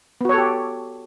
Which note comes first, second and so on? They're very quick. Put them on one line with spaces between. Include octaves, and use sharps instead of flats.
B3 F#4 C#5 A4 G4